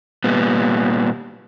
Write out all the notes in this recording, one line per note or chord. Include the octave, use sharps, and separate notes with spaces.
A#2 G3 B3